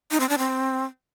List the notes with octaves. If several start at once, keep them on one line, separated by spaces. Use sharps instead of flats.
D#4
C4
D4
C4